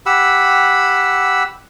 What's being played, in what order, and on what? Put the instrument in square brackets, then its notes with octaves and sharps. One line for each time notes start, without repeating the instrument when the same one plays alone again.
[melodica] G4 F#5 B5 E6